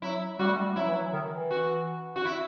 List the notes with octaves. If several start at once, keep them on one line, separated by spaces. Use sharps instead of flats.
F#3 E4
G3 F#4
A3
G3
F#3 E4
E3
F#3
D#3
E3
F#4
F#4
E4